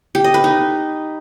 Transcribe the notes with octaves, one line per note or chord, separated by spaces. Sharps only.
G4
D#5
B4
D#4